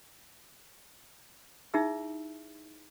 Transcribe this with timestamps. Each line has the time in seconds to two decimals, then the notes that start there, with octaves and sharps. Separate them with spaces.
1.74 D#4 E4 G#4 E5 E6